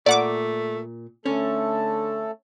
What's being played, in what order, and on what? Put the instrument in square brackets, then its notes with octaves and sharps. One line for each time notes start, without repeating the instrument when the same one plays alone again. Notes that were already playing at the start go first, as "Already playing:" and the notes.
[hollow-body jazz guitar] A#2 [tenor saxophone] A3 [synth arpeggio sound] D5 F#5 D6
[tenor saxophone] D3 [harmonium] A3 A4 [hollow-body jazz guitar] C#4